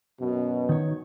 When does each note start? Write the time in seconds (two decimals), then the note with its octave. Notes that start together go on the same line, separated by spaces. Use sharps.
0.21 F#2 B2
0.69 D#3 C#5